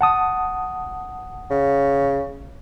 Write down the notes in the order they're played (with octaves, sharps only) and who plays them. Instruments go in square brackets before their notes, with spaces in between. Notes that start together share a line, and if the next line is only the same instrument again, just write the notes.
[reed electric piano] F#5 A5 D#6
[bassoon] C#3